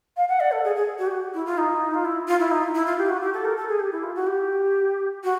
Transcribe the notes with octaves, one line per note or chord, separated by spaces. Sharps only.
F5
F#5
D5
A4
G#4
G#4
F#4
G4
F#4
E4
F4
D#4
F4
E4
F4
E4
D#4
E4
F4
G4
F#4
G4
A4
A#4
A4
G#4
G4
E4
F4
F#4
G4
F#4